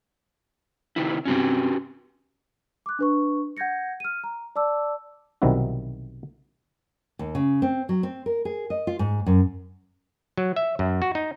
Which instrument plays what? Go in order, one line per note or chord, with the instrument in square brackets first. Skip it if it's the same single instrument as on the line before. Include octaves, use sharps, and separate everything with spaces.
[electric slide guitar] C3 D#3 E4
[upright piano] G2 C3 [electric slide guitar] C#4 F#4 G4
[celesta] D6 F#6
D4 B4 C#6
F#5 G6 G#6 A#6 C#7
F6 D#7
A#5
D5 A5 D6 E6
[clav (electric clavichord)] B1 C3 D#3 G3 E4 F#4
[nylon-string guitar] D#2
C#3
C4
F#3
C4
A#4
G#4
D#5
F4
G#2
F#2
[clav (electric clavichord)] F#3
E5
F#2
F#4
D#4